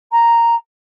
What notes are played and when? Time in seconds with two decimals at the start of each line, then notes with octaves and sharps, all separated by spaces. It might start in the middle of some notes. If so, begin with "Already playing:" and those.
0.11 A#5